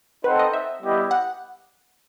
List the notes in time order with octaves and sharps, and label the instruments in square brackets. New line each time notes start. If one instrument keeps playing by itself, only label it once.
[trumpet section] C4 D#4 A4 C5 F#5 [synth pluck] B4
[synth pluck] D#5
E5
[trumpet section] G3 B3 E4 G4 D#5
[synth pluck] F#5